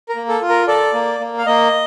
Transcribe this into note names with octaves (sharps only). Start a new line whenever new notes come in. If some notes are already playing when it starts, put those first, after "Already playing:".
A#4
A#3
A4
F4
A#4
A4 D5
A#3
A#3
F5
A#3 D#5